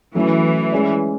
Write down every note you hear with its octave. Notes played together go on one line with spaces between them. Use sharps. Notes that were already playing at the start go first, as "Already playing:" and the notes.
E3 F#3 A3 C#4 E4
G#3 C#4 G#4 D5